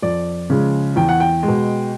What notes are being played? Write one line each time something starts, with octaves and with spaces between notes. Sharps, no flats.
F2 D5
C#3 F3 G#3
E2 G5
F#5
G5
B2 G#3